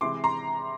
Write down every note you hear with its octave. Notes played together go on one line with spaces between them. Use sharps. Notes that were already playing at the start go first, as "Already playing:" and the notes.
C3 E3 G#3 C6 D6
A#5 C6